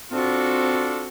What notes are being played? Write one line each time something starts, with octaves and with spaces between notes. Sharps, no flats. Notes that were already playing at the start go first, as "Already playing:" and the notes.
C4 D4 F4 F#4 A4